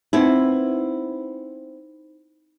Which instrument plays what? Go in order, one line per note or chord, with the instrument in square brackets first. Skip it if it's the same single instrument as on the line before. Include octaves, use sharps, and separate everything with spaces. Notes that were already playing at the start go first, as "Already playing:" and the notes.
[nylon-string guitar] B3 C4 E4 [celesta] D#4